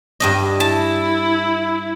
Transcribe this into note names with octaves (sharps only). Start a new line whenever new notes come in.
G2 D4 D#5
E4 A5